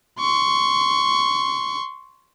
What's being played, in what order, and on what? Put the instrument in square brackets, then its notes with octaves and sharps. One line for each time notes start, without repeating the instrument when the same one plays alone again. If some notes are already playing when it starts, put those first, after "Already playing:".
[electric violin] C6 C#6